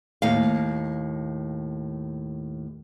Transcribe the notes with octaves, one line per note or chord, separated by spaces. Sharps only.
D#2 A2 F5